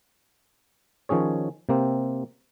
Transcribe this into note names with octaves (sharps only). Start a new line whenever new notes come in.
D#3 F3 C#4 G#4 C#5
C3 A#3 C4